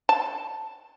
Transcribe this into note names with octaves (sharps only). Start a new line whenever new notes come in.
A5